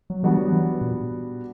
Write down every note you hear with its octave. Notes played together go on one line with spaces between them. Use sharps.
F#3
E3 G3 B3 D4 F#4
F#3
E3
A#2